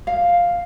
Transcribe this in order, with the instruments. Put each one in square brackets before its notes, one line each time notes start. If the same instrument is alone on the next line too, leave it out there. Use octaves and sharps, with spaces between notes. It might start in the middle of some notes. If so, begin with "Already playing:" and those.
[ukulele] F5